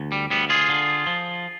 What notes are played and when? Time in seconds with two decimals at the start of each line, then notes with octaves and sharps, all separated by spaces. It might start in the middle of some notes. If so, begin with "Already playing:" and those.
Already playing: D2
0.12 G3
0.30 D2 G3 B3
0.50 F4 G#4
0.69 D3
1.07 F3